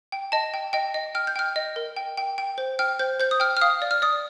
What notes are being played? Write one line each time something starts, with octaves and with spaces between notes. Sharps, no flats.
G5
D#5 A5
G5
D#5 G5
D#5
G5 F6
G6
G5 F6
D#5
A#4
G5
G5
G5
C5
G5 F6
C5 G6
C5 G6
D#6
G5 F6
F6
F5 D#6
D5
F6
D5 D#6